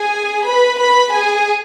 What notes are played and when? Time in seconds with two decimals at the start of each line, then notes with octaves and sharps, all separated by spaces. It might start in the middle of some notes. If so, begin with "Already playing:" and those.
Already playing: G#4 G#5
0.46 B4 B5
0.79 B4 B5
1.12 G#4 G#5